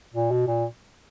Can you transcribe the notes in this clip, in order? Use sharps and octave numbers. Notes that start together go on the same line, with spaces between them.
A#2
B2
A#2